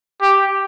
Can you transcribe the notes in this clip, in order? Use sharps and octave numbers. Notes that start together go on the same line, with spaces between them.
G4